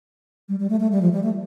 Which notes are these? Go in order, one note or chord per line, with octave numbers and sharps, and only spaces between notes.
G3
G3
A3
A3
G3
F3
G3
A3